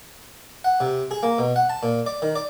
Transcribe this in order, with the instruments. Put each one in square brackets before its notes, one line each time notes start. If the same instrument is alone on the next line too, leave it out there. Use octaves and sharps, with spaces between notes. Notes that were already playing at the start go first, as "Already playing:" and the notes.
[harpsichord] F#5
C3
G#4
A#3
B2
F#5
A5
A#2
D5
D#3
D5